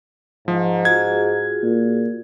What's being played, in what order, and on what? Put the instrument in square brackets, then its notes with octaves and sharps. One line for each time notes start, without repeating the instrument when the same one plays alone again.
[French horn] G#2 [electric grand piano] F3
[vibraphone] F4 F#4 G#4 [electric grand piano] G#6
[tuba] A#2